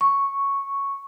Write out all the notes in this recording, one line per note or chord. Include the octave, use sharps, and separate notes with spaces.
C#6